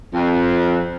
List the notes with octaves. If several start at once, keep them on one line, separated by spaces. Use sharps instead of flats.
F2